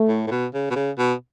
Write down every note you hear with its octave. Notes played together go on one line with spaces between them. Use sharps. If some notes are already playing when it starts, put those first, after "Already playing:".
Already playing: A3
A2
A2
B2
C#3
B2
C#3
B2